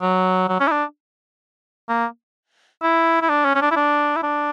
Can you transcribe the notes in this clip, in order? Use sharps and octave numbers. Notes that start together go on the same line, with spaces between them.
F#3
F#3
C#4
E4
D4
A#3
E4
E4
D4
C#4
C#4
D4
E4
D4
E4
D4